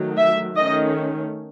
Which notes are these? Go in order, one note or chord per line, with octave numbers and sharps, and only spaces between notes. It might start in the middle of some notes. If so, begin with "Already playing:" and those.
Already playing: D#3 F#3 A3
E5
D#3 A3 C#4 D#5